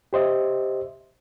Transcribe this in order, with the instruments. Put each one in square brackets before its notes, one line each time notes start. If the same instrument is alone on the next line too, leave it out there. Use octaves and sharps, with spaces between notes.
[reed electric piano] G4 C5 D#5 E5